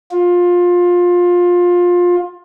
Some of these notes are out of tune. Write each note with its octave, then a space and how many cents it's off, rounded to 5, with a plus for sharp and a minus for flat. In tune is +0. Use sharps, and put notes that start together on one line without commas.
F4 +20